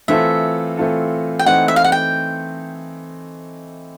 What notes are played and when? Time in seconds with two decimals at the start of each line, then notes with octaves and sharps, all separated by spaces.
0.08 E3 A3 C4 F4 A4 E5
0.77 E3 A3 C4 F4 A4
1.39 G5
1.46 E3 A3 C4 D#4 F#5
1.68 E5
1.76 F5
1.84 F#5
1.92 G5